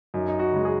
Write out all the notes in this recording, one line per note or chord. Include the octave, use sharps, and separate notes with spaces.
F#2 D#4
D#4
F#4
C#3 G#3
G#4